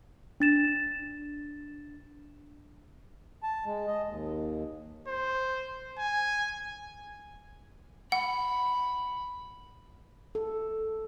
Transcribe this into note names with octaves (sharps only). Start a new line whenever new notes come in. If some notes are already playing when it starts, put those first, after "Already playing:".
D4 A6 E7
A5
G#3
D#5
D#2
C5
G#5
F#5 B5
A4